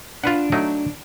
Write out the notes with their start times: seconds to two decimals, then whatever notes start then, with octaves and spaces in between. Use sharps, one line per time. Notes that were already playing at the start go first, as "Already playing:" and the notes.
0.24 D4 F4 B4 F#5
0.52 F#3 A3 D#4